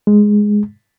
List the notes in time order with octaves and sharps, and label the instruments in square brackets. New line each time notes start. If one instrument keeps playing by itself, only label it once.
[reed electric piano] G#3